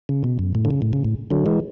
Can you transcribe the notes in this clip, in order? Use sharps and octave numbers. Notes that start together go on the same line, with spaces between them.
C#3
B2
F#2
A2
D3
C#3
A2
C#3
A2
D3 F#3
E3 G#3